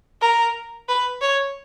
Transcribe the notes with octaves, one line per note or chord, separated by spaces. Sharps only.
A#4
B4
C#5